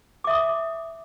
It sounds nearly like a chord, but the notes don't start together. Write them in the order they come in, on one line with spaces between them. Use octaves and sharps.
D6 E5 D#6